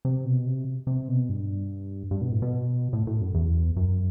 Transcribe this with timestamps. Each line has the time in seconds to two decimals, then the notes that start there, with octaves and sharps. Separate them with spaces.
0.05 C3
0.25 B2
0.46 C3
0.87 C3
1.08 B2
1.29 G2
2.11 G2
2.21 B2
2.31 A2
2.42 B2
2.93 A2
3.07 A2
3.21 F#2
3.34 E2
3.76 F#2